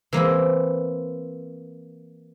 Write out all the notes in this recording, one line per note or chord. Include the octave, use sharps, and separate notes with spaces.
E3 A#3 C4 E4